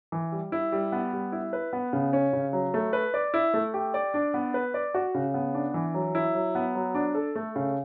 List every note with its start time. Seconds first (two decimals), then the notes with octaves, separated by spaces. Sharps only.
0.12 E3
0.32 G3
0.52 E4
0.72 G3
0.92 B3
1.13 G3
1.32 E4
1.53 B4
1.73 B3
1.93 C#3
2.13 C#4
2.33 C#3
2.53 F#3
2.74 A3
2.93 B4
3.14 D5
3.34 E4
3.54 A3
3.74 G4
3.94 D5
4.14 D4
4.34 B3
4.54 B4
4.74 D5
4.94 F#4
5.14 C#3
5.34 B3
5.54 D4
5.74 E3
5.94 F#3
6.15 E4
6.35 F#3
6.55 B3
6.75 F#3
6.94 D4
7.15 A4
7.35 A3
7.56 C#3